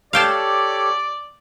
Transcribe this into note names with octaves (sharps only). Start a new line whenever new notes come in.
G4 A4 C#5 D5 F5 G5 A5